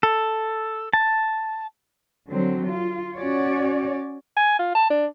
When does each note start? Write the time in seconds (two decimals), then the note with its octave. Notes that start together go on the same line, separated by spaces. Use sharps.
0.03 A4
0.93 A5
2.29 D3 F#3 C4
2.69 F4
3.17 C#4 F#4 C#5 D5
4.37 G#5
4.59 F4
4.75 A5
4.90 D4